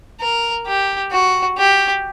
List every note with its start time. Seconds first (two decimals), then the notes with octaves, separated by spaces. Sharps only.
0.20 A#4
0.67 G4
1.12 F#4
1.58 G4